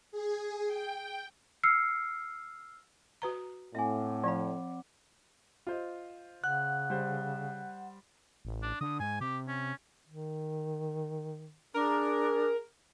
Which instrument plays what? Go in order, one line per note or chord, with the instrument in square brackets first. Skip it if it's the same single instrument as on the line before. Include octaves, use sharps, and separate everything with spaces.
[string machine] G#4
G5
[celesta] E6 F6 C7 C#7
[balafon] F#4 B4 A#5
[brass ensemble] A2 [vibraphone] C4 F#5 D6 [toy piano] E5 G#5
[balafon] F3 [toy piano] D5 F5 B5
[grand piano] F4 C5 D#5
[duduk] C#3 [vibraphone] F#5 [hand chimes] F#6
[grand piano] G3 C5
[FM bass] A1
[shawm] D4
[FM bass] D3 [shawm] D#6
[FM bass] G#2 [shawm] G#5
[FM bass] C3 [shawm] G4
[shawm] C#4
[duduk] D#3
[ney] D4 [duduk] G#4 [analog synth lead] A#4